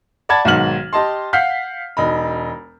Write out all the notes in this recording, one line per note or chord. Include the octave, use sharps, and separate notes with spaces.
D5 F#5 A5 B5 G#6 A6
B1 G#2 D#3 F#5 F6 F#7
G4 D#5 A5 C6
F5 F#5 F6 G6 B6 C7
E1 D#4 B5